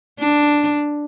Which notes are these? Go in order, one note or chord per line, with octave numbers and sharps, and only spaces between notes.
D4